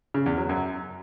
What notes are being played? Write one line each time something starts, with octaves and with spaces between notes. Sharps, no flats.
C#3
E2
F#3
F#2